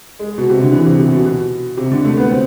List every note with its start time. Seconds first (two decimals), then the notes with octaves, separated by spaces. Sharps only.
0.19 G#3
0.38 B2
0.50 C3
0.61 D3
0.72 E3
0.86 C3
0.99 C3
1.12 B2
1.25 B2
1.77 C3
1.92 D3
2.05 A3
2.17 B3
2.31 C4